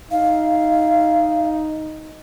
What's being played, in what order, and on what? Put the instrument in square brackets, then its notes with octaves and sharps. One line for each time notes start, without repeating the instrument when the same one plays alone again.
[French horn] D#4 [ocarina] F5